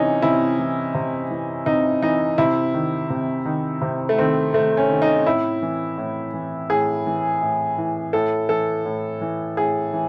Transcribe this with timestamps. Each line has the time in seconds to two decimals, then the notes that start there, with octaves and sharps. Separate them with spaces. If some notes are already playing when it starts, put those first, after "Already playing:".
Already playing: C3 E3 C#4 D#4
0.22 C3 E4
0.59 E3
0.94 C3
1.30 E3
1.66 C3 D#4
2.02 E3 D#4
2.38 C3 E4
2.74 D#3
3.10 C3
3.45 D#3
3.81 C3
4.09 A3
4.18 D#3 C4
4.54 C3 A3
4.77 C#4
4.89 D#3
5.02 D#4
5.26 A2 E4
5.62 E3
5.98 A2
6.34 E3
6.70 A2 G#4
7.06 E3
7.42 A2
7.78 E3
8.13 A2 A4
8.49 E3 A4
8.85 A2
9.21 E3
9.57 A2 G#4
9.93 E3